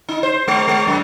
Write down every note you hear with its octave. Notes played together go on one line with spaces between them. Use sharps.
D#4
C5
G#3
G#3
F#2